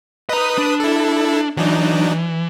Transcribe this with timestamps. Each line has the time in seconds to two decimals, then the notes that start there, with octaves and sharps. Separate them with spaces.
0.29 B4 D#5 A#5 D#6
0.58 D4
0.80 E4 A4
1.57 E3 F#3 D4 D#4